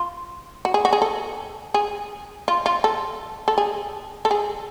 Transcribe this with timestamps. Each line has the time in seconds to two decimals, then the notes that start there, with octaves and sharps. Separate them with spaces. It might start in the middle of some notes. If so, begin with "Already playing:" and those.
Already playing: F4
0.65 F#4
0.74 G#4
0.85 F#4
0.93 G#4
1.02 A4
1.74 G#4
2.48 F4
2.66 F4
2.84 A4
3.48 A4
3.58 G#4
4.25 A4
4.31 G#4